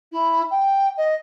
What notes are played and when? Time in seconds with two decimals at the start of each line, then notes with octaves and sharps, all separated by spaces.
0.12 E4
0.50 G5
0.97 D#5